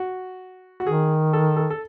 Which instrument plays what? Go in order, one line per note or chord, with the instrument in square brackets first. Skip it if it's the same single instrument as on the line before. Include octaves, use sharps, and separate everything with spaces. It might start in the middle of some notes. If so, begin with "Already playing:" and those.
Already playing: [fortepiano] F#4
F#4
[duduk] D#3 [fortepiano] G#4
[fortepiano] A4
A4
A4